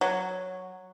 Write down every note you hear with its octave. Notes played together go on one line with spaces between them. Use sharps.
F#3